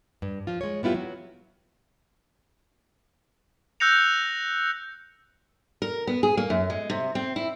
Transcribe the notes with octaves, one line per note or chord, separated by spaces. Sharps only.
G2
F3 F4
G#3 C#5
G3 B3 E4 F4 G4
F#3
E6 F#6 G6 A#6 C#7 F7
A#4
B3
G#4
A#3
F#2
G#3
C3
C4
E4